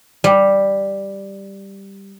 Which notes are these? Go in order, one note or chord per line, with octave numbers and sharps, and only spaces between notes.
G3